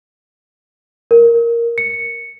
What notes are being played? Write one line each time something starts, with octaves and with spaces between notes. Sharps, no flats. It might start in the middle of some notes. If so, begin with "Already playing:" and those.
A#4
C#7